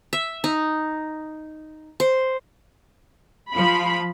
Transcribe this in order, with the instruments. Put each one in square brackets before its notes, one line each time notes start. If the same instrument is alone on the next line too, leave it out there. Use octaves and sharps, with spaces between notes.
[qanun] E5
D#4
C5
[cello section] F3 [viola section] B5